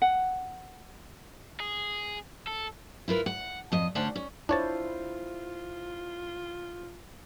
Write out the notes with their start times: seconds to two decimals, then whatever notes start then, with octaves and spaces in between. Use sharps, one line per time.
0.02 F#5
1.60 G#4
2.47 A4
3.08 E4 F4 A#4 B4
3.26 F#5
3.72 F2 D#5
3.95 D2 C#4 D4 C5 F#5
4.16 C#4
4.49 D4 E4 F4 C5 C#5 A5